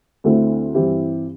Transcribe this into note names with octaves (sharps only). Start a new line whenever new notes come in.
D2 D3 A3 C4 E4
G2 E3 C4 E4 G4